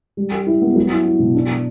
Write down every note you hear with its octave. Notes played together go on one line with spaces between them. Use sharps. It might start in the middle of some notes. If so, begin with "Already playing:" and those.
G3
G4
E4
B3
F#3
E4
E4
B2
D4
D4